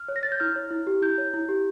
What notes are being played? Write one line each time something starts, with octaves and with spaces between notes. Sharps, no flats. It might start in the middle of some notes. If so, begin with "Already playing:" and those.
Already playing: F6
C#5
A#6
C#5 A6
G6
E4 F6
C#5
E4
G4
E4 G6
C#5
E4
G4